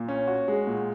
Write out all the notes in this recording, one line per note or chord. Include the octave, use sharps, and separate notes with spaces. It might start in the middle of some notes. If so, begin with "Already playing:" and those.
Already playing: A#2
C#4
F#4
G#3
A#2